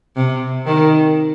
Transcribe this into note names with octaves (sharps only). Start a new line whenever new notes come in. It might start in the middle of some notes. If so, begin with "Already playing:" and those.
C3
D#3